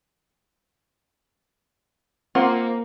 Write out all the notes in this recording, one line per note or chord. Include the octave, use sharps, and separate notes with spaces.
A#3 C4 F4 F#5